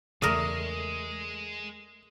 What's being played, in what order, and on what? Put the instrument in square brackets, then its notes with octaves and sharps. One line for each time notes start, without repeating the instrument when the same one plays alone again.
[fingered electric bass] E2 C#3 [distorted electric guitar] G#3 [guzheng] A3 A#4 D5 [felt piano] D#6